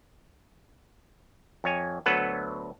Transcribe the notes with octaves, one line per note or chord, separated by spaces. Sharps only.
F2 C#5 G#5
D2 F#3 B3 A4 B4 F#5